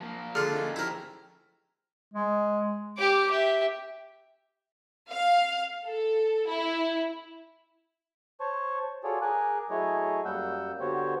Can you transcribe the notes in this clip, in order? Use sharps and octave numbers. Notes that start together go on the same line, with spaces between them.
F3 A#3
D3 F4 G#4 F6
C#4 D#4
F3 E4 G4 A#4
G#3
G4 D6
G4 E5
F5
A4
E4
C5 C#5 A5 C#6
F4 F#4 G#4 A4 C#5 D5
G#4 A#4 G#5 D6 F#6
F#3 A3 E4 G#4 C#5 D#5
F#2 G3 A#3 F#5 E6 G6
D3 B3 F#4 G4 C5 C#5